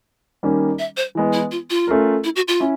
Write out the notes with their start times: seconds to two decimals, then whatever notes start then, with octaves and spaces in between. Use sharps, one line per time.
0.43 D#3 G3 A#3 C#4
0.79 E5
0.97 C5
1.15 E3 G#3 B3
1.33 E4
1.51 F4
1.70 F4
1.87 A3 C#4 F4 A#4
2.24 E4
2.36 F#4
2.48 F4
2.60 C#4 E4